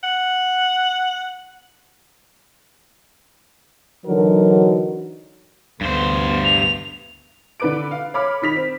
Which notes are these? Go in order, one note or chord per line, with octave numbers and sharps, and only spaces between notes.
F#5
D3 E3 F#3 D#4 F#4 A#4
D2 G2 B3 C5
F7
D3 D4 B4 D6 D7
F5
C#5 B5 D6 F6
D#3 D#4 B6 F7
C4